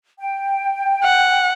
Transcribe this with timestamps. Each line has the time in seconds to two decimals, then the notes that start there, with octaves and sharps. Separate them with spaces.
0.19 G5
1.04 F#5